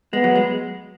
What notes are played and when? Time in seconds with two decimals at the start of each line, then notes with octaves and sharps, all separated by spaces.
0.13 G#3 B3
0.24 F#3
0.35 G#3